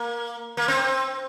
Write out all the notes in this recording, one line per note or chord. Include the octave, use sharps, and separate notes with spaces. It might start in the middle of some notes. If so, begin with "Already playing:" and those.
Already playing: A#3
A#3
C4